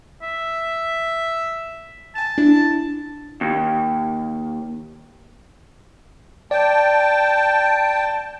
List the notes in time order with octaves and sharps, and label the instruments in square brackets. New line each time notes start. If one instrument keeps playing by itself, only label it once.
[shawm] E5
[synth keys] G#5 E7 [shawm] A5
[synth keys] D4 E4
[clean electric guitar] D#2
[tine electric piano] D5 [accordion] G5 A5